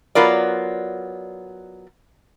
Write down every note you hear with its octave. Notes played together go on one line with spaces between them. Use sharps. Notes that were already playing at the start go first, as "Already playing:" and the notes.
F#3 B3 F4 A#4 D5